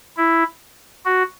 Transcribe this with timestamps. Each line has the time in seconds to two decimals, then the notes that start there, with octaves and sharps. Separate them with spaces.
0.17 E4
1.05 F#4